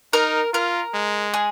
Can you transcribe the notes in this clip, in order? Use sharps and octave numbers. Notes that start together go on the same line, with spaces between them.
D#4 A#4
F4 A#4
G#3
G#4